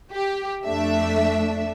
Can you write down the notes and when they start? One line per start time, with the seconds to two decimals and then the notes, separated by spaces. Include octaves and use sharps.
0.14 G4
0.66 F2 A3 D4 E5